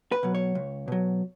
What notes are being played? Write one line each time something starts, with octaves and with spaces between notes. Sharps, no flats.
B4
B2 F#3
C#5
C#2
B2 F#3